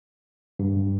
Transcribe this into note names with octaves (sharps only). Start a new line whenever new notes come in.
G2